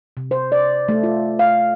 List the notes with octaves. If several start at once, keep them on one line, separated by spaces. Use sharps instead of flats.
C3
C5
D5
A3
F4
F5